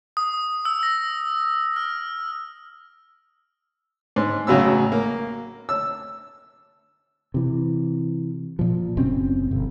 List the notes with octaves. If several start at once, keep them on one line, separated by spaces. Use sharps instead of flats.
D#6
E6
A#6
F6
G#2
A1 C#3 F#3 B3 E6
A#3
E6
C3 E3
A#2 F3
F#1 B2 C4 C#4
G1